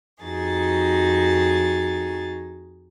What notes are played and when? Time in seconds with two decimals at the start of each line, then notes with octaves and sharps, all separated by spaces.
0.22 F2 D#4 F#4 G#4 A6